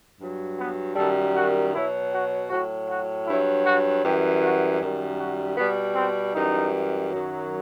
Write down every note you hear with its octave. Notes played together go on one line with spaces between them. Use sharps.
G2 F#3
B3
F#2 D#3 G3 A4
F#4
B2 F#3 E4
F#4
A2 F#3 F#4
F#4
G2 F#3 E4
F#4
F#2 E3 G3 G4
F#4
F#2 D#3 G3
F#4
B2 G3 B3
C4
F#2 E3 G3 D#4
F#2 D#3 F#3